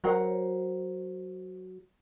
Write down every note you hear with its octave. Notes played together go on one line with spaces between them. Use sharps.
F#3 A#4 C5 F#5